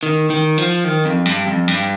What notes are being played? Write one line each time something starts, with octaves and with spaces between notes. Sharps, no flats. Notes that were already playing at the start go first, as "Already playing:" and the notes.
D#3
D#3
F3
D#3
F2
G2
F2
G2